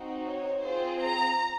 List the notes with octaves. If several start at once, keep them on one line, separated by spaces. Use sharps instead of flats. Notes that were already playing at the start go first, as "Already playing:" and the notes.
Already playing: C4 D#4 F#4
C#5
C4 F4 G#4 C5
A#5